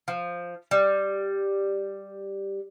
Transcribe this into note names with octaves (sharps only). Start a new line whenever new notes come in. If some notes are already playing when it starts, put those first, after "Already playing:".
F3
G3